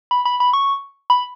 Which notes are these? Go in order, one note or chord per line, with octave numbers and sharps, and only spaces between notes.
B5
B5
B5
C#6
B5